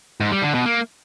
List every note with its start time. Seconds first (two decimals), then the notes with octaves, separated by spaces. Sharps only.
0.20 G#2
0.32 G3
0.43 D3
0.54 B2
0.66 A#3